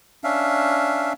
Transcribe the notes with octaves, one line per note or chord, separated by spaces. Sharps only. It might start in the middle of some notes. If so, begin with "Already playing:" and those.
C#4 D4 E5 F5